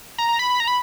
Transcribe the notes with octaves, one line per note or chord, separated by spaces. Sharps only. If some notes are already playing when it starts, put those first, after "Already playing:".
A#5
A#5
B5
B5
A#5
B5